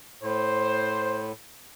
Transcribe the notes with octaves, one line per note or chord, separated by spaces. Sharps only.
A2 C5